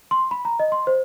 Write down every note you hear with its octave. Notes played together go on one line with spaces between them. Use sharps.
C6
B5
A#5
D#5
C6
C5